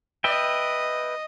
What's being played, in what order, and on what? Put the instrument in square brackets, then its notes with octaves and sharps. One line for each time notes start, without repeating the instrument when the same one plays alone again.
[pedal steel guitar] B4 E5 G5 [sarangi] D#5